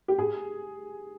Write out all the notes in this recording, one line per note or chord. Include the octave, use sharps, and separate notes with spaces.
G4
G#4